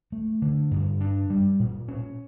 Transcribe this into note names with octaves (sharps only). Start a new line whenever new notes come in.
A3
D3
G2
D4
G3
A#2
C#4